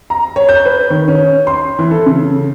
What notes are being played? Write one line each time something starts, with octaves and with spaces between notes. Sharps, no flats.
A#5
C#5
G6
B4
D#3
C#4
C6
E3
A4
C#3